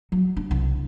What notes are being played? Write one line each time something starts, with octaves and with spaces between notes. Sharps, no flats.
F#3
D4
C2